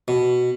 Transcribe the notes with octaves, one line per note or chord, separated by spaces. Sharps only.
B2